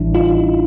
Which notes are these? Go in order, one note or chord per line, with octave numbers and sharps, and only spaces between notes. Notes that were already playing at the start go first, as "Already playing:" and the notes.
Already playing: A1 A2 E3 G3 D4 E4
D#4 F4